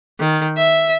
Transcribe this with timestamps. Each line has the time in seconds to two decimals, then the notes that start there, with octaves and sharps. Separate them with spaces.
0.19 D#3
0.57 E5